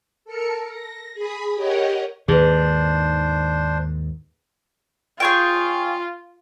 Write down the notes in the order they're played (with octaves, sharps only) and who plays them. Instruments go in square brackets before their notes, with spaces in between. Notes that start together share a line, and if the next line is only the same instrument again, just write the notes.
[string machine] A4 A#4 C#7
A#6
G#4 B5 D#6
G4 A#4 C#5 D#5 F#5
[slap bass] D#2 G#2 D#3 [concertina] D4 C5 [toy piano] G#4 B4
[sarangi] F4 [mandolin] G#4 C#5 G5